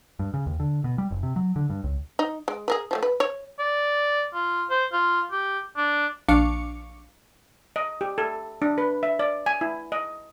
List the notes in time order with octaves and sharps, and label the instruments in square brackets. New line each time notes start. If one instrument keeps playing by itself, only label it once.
[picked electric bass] G2
C#3
D#2
D3
B2
G3
F#1
C3
F#3
D3
G2
C#2
[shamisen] D#4
G#3
G#4 A#4 B4
F3 G3 A3
B4
C#5
[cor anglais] D5
F4
C5
F4
G4
D4
[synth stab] A#1 D4 F5 C#6 D6 C#7
[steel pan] D#5
G4
A4
D4
B4
E5
D5
G#5
E4
D#5